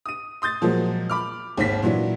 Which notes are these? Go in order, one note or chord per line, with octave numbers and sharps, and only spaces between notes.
D#6 D#7
C6 D#6 G6 A6
A#2 F3 F#3 G#3 A#3
B5 D6 F6
G#1 D#2 B6
A#2 E3 F#3 D4